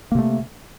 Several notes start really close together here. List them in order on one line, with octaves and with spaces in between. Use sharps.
A#3 C3 A3